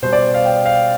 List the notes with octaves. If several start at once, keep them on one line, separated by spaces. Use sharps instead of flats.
B2 G3 C5
D5
F5
G5
F5